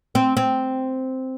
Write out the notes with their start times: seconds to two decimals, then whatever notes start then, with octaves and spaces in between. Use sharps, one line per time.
0.15 C4
0.37 C4